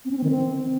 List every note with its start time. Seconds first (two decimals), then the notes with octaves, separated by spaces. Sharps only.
0.05 C4
0.11 C#4
0.17 C4
0.24 D#3
0.30 C4